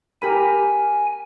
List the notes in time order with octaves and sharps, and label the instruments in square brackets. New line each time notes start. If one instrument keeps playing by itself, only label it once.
[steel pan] G4 A#4 B5 [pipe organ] G#5